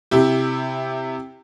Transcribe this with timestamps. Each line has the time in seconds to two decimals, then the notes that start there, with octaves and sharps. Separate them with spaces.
0.11 C3 E4 G4